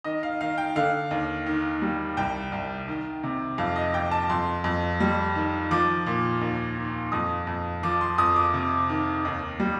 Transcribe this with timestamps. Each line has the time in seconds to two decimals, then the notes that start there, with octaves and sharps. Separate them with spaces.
0.04 D#3 D#5
0.23 F5
0.41 D#3 F5
0.58 G5
0.76 D3 F5
1.11 D#2
1.46 D#3
1.82 G3
2.17 C2 G5
2.52 C2
2.88 D#3
3.23 C3
3.58 F2 F5
3.76 D#5
3.94 F2 G5
4.11 A5
4.29 F2 C6
4.64 F2
5.00 G3
5.35 D#3
5.71 F3 D6
6.06 A#2
6.41 D#2
6.77 D#3
7.12 F2 D#6
7.47 F2
7.83 F3 D6
8.01 C6
8.18 F2 D#6
8.36 D6
8.54 C3
8.89 D#3
9.25 D#2
9.60 G3